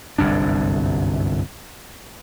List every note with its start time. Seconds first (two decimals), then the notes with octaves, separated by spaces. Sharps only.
0.18 G1 C2 F#2 D4